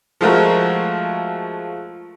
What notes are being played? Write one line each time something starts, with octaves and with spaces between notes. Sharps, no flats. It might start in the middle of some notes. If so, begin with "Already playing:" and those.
F3 G#3 A3 F4 F#4 A#4